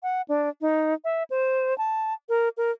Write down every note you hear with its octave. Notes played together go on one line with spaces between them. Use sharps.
F#5
D4
D#4
E5
C5
A5
A#4
A#4